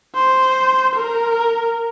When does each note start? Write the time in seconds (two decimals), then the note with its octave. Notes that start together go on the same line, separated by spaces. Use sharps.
0.15 C5
0.95 A#4